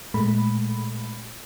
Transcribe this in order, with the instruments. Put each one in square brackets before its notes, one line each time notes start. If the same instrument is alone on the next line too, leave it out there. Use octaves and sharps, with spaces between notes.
[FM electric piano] A#2 G#3 A3 B5